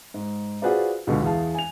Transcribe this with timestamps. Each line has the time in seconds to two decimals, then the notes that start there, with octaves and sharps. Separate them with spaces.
0.14 G#2
0.62 F4 F#4 G#4 B4 C5 D5
1.07 C#2 B2 D3
1.23 E2 G#4 F5 A5
1.55 G#5 F7